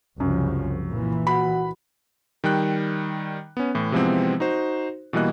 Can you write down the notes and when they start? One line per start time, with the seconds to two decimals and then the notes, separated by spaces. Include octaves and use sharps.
0.20 C2 F#2 C#3 F3
0.89 A#2 E3
1.27 F#4 F#5 B5
2.44 D#3 G3 G5 F#6
3.57 B3 C#4
3.75 A2 E3
3.92 C3 E3 F3 G#3 B3 C4
4.40 D#4 F#4 C5
5.13 B2 E3 G3 A#3 D#5 F#6